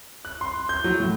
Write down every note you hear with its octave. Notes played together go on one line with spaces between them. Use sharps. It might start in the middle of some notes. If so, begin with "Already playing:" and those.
F#6
C6
G6
F#3
A2